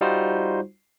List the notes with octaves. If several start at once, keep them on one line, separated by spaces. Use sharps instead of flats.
G3 D#4 F4 F#4 C5